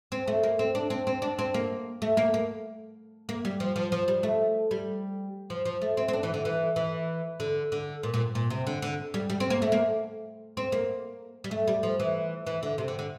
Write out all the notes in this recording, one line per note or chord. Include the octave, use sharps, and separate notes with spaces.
C4
A3
A#3
C4
D4
C4
C4
D4
C4
A#3
A3
A#3
A#3
A#3
G3
F3
F3
F3
G3
A3
G3
F3
F3
A3
C4
C4
D4
E3
D3
E3
E3
D3
D3
A#2
A#2
A#2
C3
D3
D3
G3
G3
C4
A#3
A3
A#3
C4
A#3
G3
A3
G3
F3
E3
E3
D3
C3
D3
D3